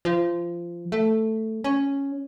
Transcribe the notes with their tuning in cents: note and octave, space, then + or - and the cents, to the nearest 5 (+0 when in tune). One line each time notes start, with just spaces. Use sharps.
F3 -20
A3 +5
C#4 +0